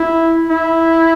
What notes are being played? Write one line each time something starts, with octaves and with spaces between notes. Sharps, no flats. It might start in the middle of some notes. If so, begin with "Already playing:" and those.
Already playing: E4
E4